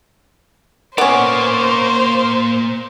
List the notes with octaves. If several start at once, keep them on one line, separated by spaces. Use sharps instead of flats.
A#3 B3 C#4 C5 D5